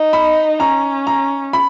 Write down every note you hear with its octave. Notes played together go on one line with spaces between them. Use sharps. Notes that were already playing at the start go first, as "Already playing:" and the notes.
Already playing: D#4
B5
C#4 A#5
A#5
B5